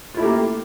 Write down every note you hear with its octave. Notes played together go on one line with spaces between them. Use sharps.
A3 A#3 E4 F4 G4